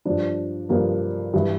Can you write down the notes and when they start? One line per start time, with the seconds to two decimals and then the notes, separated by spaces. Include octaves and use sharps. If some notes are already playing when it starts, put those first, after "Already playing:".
0.05 G2 F3 D4
0.69 G2 F3 A#3
1.33 G2 E3